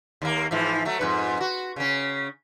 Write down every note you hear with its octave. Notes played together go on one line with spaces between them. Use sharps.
D#2 A#3
G#2 E3 F3
F#3 A3
F2 G#2 B4
F#4
C#3 C#4